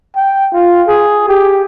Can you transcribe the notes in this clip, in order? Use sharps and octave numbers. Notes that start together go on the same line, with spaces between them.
G5
F4
G#4
G4